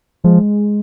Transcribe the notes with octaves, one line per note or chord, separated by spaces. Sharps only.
F3 G#3